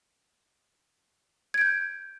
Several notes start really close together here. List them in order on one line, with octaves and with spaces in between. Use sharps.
G#6 D7 G6